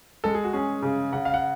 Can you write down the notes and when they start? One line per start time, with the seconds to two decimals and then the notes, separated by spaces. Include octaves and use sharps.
0.24 G#3 A4
0.34 G#4
0.44 F#4
0.53 C#4 G#4
0.82 C#3
1.12 C#3 F#5
1.25 F5
1.34 F#5